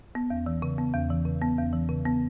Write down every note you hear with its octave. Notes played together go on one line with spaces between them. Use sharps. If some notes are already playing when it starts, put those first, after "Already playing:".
B3
E2
E3
C#3
B3
E2
E3
C#3
B3
E2
E3
C#3
B3